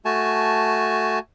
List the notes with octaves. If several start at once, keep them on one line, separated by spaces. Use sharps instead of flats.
A3 F#4 G#5 A5